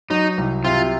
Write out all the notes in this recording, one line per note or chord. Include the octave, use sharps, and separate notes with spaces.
F#3 D#4
C2
C3 F4